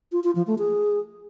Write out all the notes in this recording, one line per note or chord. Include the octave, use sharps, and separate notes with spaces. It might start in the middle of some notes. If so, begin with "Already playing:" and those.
F4
F4
F3
A3
G#4